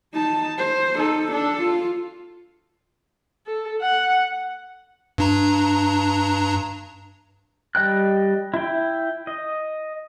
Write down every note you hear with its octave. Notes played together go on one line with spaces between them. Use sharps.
D#4 A5
C5
D#4 A4
D4 A4
F4
A4
F#5
G2 D4 A#5
G3 D#5 G5 F#6
E4 G5
D#5